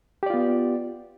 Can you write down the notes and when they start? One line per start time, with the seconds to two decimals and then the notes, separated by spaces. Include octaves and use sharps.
0.23 G4
0.26 D5
0.30 F4
0.34 B3